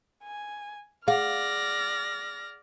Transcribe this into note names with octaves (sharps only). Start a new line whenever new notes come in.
G#5
G#4 D5 F5 F#5 F6 A#6